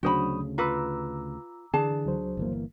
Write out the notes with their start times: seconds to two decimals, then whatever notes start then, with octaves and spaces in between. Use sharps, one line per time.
0.03 D2 C#3 F#3 D4 F#4 C5 B5 D#6
0.58 F4 B4 A#5 D6 E6
1.74 D3 E3 D4 G#4 A5
2.05 C#2 F#3 C5
2.37 G1 E3 A#3